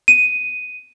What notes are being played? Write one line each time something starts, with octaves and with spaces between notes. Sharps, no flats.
D#7